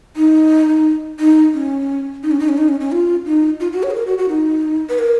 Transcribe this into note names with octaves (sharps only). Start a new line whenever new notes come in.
D#4
D#4
C#4
D#4
C#4
D#4
C#4
D#4
C#4
C#4
F4
D#4
F4
F#4
C#5
G#4
A#4
F#4
F#4
D#4
B4
A#4